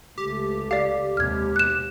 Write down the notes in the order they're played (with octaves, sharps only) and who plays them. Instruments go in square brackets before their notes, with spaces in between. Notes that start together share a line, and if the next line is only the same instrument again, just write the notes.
[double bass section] C#2 A3 [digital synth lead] G4
[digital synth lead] G4 [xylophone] D5 F5
[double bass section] D#2 C3 G#3 [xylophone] F6 G#6
[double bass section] B2 [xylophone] F#6 E7